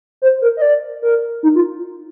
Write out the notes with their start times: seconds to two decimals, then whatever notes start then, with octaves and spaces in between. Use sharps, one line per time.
0.22 C5
0.42 A#4
0.57 D#5
0.62 D5
1.02 A#4
1.43 D#4
1.55 F4